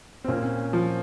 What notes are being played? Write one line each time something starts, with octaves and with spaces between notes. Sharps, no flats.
C4
A#2 C#4
F3